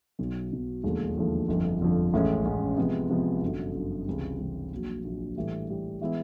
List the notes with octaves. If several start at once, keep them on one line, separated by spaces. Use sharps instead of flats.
B1 B2 F#3
B1 B2 F#3
E1 D#2 D3 F3 A3
E1 D#2 D3 F3 A3
G1 F2 D3 F3
G1 F2 D3 F3
A1 A2 E3 G#3 C#4
A1 A2 E3 G#3 C#4
C3 F3 G#3 B3
C3 F3 G#3 B3
G1 F#2 D3 F#3
G1 F#2 D3 F#3
C#2 C3 E3 G3 C4
C#2 C3 E3 G3 C4
A#1 A#2 F#3
A#1 A#2 F#3
A2 E3 G3
A2 E3 G3
E3 G#3 B3 E4